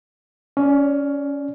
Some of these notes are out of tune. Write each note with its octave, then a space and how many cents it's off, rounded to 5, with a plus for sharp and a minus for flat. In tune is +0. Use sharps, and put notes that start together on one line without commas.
C#4 +15 D5 -5